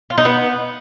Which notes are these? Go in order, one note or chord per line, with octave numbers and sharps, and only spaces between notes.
F4
D#4
B3